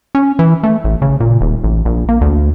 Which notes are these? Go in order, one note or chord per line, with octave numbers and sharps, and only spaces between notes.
C#4
E3
A3
A1
C#3
A#2
D#1
A1
A#1
A#3
D2